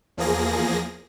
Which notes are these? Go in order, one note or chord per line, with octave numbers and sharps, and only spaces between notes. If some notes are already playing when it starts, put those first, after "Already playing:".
E2 F3 A#3 G#4 A#6